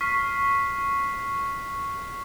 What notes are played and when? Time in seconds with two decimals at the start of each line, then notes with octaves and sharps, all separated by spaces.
0.01 C#6 F6 B6 C7